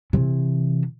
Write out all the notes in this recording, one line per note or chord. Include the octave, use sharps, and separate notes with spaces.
C3 E3